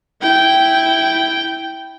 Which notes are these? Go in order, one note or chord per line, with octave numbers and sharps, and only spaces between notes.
E4 G5